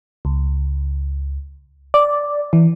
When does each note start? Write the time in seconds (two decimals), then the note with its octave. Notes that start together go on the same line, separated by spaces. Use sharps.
0.25 C#2
1.94 D5
2.53 E3